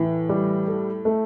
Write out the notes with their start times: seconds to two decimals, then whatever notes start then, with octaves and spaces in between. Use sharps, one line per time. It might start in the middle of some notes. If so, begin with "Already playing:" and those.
Already playing: A2 E3
0.29 G3
0.68 A4
1.05 A3